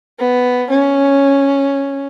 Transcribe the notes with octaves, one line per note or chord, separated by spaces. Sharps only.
B3
C#4